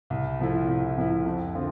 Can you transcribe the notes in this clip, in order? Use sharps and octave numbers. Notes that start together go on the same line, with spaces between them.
C2
C3 F3 A3 E4
C2
C3 F3 A3 E4
F2
D3 F3 C4 F4